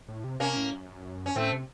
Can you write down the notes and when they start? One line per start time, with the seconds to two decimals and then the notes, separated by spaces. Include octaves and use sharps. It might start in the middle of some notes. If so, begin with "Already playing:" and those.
0.08 A2
0.24 C3
0.40 C3 A#3 C#4
0.56 A2
0.72 F#2
1.26 C#4
1.36 A2 A3 C4
1.52 C3